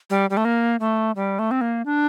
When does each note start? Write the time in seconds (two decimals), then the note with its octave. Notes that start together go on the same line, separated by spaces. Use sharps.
0.10 G3
0.30 G3
0.37 A3
0.45 A#3
0.80 A3
1.16 G3
1.39 A3
1.51 C4
1.61 A#3
1.86 D4